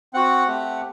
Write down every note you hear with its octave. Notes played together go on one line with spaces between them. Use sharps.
C4 F#4 F#5
A3 C4 G4